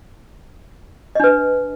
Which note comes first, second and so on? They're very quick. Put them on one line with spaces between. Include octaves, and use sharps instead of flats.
D#5 D4 B4